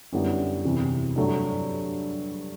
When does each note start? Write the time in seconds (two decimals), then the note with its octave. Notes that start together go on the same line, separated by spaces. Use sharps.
0.13 F#2 D3 G3 B3 E4
0.65 E2 C3 E3
1.16 G2 F#3 A3